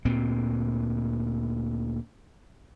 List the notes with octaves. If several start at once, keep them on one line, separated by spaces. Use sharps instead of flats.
D2 A#2 C4